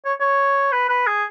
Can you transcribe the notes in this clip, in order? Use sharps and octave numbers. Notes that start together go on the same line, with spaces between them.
C#5
C#5
B4
B4
G#4